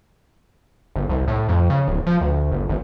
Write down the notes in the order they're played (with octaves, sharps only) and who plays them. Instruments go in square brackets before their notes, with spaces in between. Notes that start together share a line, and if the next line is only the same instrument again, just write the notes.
[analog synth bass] G1
C2
A2
F2
C#3
D1
F3
D2
G1
G#1